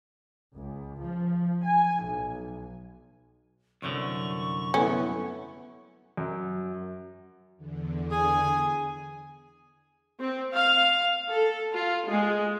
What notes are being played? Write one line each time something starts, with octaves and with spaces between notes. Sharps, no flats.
C#2
F3
G#5
B1
C2 F#2 D3 C#6
A3 B3 C#4 E4
F#2
E2 D3
G#4 G#5
C4
F5
A4
F4
G#3